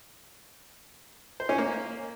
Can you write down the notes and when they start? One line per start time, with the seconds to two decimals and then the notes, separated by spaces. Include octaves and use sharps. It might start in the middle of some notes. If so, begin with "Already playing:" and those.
1.40 C5
1.49 C#4
1.58 A#3